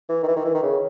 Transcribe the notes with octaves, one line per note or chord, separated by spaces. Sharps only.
E3
D#3
E3
D#3
E3
D#3
C#3